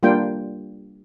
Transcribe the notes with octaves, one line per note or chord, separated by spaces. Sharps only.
G3 A#3 D4 F4 G5